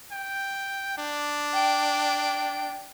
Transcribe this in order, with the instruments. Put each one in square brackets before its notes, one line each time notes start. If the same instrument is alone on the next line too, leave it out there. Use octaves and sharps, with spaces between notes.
[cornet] G5
D4
[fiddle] G5